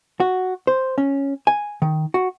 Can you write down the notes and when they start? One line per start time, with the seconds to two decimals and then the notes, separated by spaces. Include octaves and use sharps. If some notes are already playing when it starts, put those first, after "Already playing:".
0.20 F#4
0.67 C5
0.98 C#4
1.47 G#5
1.82 D#3
2.14 F#4